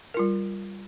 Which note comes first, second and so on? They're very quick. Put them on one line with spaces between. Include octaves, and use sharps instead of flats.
A#4 F4 G3